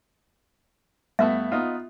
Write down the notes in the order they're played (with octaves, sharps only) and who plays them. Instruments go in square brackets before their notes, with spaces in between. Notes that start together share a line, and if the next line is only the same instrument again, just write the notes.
[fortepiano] G2 A3 B3 [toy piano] E5
[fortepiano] B3 D#4 F4